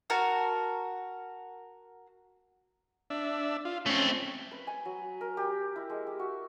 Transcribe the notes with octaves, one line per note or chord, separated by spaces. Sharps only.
F#4 A#4 A5
D4 E5
F4
A3 C4 C#4
B4
G#5
F#3
A#4
G4
E4
G#3
G4
F#4